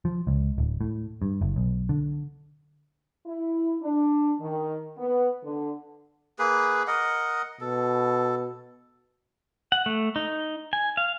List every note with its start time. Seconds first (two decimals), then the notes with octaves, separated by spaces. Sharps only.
0.05 F3
0.27 C#2
0.58 D1
0.81 A2
1.22 G2
1.41 F#1
1.56 B1
1.89 D3
3.26 E4
3.82 D4
4.41 D#3
4.98 B3
5.43 D3
6.39 A#3 G#4 B4
6.87 A#4 D#5 F#5
7.61 B2 A4
9.72 F#5
9.86 A3
10.16 D#4
10.73 G#5
10.97 F5